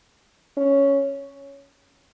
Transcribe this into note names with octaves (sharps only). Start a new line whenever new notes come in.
C#4